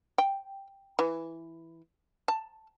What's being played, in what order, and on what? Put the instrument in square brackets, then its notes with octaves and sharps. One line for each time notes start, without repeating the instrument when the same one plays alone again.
[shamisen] G5
E3
A5